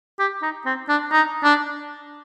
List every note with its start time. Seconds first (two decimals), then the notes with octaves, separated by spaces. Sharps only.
0.19 G4
0.42 D#4
0.66 C4
0.89 D4
1.12 D#4
1.44 D4